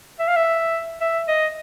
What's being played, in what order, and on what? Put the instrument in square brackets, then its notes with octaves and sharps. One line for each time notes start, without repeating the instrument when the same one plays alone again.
[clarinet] E5
F5
E5
E5
D#5